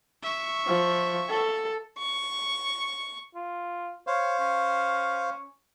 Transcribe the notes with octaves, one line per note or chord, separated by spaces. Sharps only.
E5 C#6
F3
A4
C#6
F4
C5 C#5 F5
C#4